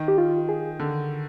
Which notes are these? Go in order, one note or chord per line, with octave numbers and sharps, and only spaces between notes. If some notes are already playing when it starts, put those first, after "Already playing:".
Already playing: D#3
G4
F4
G#4
D3